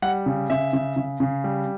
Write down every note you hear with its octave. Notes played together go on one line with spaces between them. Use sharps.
G3 F#5
C#3
C#3 E5
C#3
C#3
C#3
G3